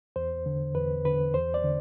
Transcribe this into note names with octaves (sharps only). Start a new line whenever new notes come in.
E2 C5
D3
E2 B4
D3 B4
E2 C5
D5
D3